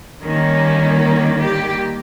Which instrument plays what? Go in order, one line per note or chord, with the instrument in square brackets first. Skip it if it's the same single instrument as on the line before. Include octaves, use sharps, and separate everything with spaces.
[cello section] D#3 G3 A#3 C#4
G4